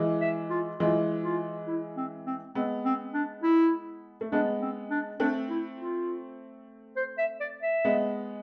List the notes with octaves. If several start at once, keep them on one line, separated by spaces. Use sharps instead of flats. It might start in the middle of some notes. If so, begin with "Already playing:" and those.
Already playing: E3 G#3
E5
F4
E3 G#3 F4
F4
E4
C4
C4
G#3 B3 C4
C4
D4
E4
A3
G#3 B3 D4
C4
D4
A3 C4 D4
E4
F4
C5
E5
D5
E5
G#3 B3